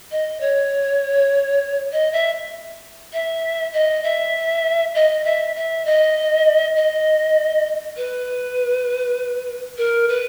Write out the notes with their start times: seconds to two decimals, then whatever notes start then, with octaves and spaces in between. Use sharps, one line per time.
0.11 D#5
0.41 C#5
1.92 D#5
2.12 E5
3.13 E5
3.73 D#5
4.04 E5
4.95 D#5
5.25 E5
5.56 E5
5.85 D#5
6.76 D#5
7.97 B4
9.78 A#4
10.09 B4